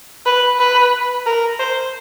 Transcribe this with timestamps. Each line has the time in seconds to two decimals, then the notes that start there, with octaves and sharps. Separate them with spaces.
0.26 B4
0.59 B4
1.26 A#4
1.59 C5